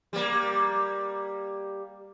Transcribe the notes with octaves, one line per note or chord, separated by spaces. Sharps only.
G3 A#3